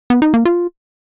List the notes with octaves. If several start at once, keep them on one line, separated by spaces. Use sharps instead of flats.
B3
D#4
A#3
F4